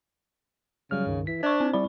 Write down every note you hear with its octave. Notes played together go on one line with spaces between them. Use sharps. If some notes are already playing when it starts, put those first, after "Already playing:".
C#3 F#3 G3 F6
C#2 G2 D#3
E3 B6
D4 C5 C#6
C4
G3 E4 D5 B5